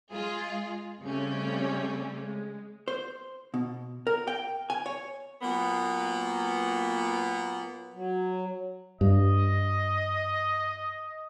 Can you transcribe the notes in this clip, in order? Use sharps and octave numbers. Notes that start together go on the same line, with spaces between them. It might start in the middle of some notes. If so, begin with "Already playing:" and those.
G#3 F4 G#4
C#3 G3 A3 C4 C#4
G#3
C5
B2
A#4
G5
G#5
C#5
A#2 F#3 A#3 B3
F#3
G2 D#5